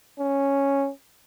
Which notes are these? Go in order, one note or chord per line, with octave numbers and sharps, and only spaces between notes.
C#4